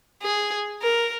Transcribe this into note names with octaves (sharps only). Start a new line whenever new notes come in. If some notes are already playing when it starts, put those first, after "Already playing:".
G#4
A#4